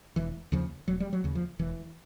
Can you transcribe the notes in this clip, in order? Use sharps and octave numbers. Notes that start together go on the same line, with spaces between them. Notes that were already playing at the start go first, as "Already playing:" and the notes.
E1 E3
D#2 C#3 F3
E1 F#3
G3
F#3
D#2 C#3
F3
E1 E3